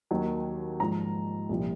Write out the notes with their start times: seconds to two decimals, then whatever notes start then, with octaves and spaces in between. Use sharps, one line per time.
0.11 D#2 D#3 F#3
0.80 G#2 F3 A#5
1.49 C2 A#2 F3